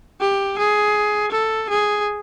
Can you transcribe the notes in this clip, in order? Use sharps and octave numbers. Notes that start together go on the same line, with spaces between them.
G4
G#4
A4
G#4